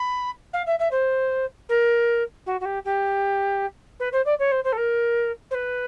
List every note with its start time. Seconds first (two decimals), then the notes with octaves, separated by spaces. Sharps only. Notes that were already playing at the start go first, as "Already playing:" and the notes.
Already playing: B5
0.53 F5
0.66 E5
0.79 E5
0.91 C5
1.69 A#4
2.46 F#4
2.60 F#4
2.65 G4
2.84 G4
3.99 B4
4.12 C5
4.25 D5
4.39 C#5
4.51 C5
4.64 C5
4.72 A4
4.77 A#4
5.50 C5
5.54 B4